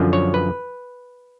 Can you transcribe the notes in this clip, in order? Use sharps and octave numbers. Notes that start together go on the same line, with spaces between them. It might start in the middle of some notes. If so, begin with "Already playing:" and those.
Already playing: F#2 D3 F3
C#5
B4